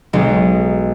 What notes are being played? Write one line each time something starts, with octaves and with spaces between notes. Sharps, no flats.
B1 G#3